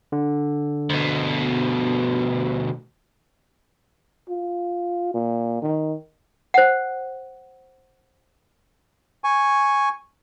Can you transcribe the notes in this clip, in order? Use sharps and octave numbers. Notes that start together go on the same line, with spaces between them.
D3
D2 B2
F4
A#2
D#3
C5 F#5
G#5 C#6